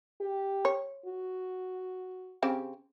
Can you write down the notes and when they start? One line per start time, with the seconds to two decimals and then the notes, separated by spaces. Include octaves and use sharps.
0.21 G4
0.65 C#5
1.06 F#4
2.42 C#3 C4 G4